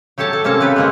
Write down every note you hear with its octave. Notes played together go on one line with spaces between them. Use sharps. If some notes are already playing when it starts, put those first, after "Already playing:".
F#3 G4 A4 C#5 A5
A4
C3 A#3 C#4 A4 A5
C#3 F#3 G4 B4
G#3 A#3 C4